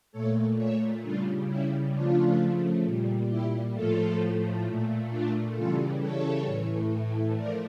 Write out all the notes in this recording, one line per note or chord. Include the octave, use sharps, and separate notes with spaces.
A#2 A3 A4 C#5
C#5 E5
C#3 G3 D4 F4
C#4 E4
C#3 F3 A3 D4 F4
A#2 G3
E4 G4
A2 F3 A3 F4 A4
A#2 A3
D4 F4
C#3 E3 G3 F4 A4
A4 C#5
A2 E3 A3
F3 A3 A#4 D5